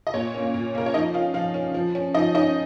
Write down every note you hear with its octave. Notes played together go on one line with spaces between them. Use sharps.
D#5
A#2 C#5
A#3 C#4
A#2
A#3 C#4 A#4
C#5
F3 D#4 D#5
C#4 F4 F5
F3 F4 F5
C#4
F3
C#4
F3 D#4 D#5
C#4 D#4 D#5